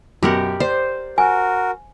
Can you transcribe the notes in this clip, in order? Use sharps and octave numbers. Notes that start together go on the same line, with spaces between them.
F#2 B2 G4 A#4 F#5
C5 D5
F#4 A#4 G#5